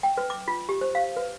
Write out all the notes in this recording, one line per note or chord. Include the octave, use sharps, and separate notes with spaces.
G5
B4
D6
F4
G4
C5
F5
B4